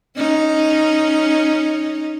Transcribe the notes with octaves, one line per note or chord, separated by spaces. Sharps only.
C#4 D#4